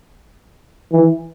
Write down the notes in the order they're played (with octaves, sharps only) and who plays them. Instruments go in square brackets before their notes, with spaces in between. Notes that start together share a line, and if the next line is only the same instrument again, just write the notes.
[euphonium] E3